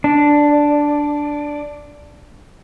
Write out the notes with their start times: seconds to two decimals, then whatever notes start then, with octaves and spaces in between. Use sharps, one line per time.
0.04 D4 D5